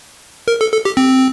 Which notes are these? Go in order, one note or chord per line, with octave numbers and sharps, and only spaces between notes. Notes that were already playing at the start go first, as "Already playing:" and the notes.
A#4
A4
A4
G4
C4